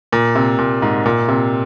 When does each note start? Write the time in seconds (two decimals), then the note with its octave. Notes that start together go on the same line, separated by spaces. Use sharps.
0.13 A#2
0.36 C3
0.58 A#2
0.82 G#2
1.06 A#2
1.29 C3